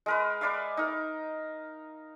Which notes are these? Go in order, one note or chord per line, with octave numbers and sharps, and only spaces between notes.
G#3 A#4 B4
B4 D5 E5 F5
D#4 A#4